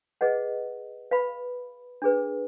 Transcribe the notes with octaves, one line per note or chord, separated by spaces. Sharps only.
G#4 B4 D#5 F#5
B4 F5 B5
D4 G#4 B4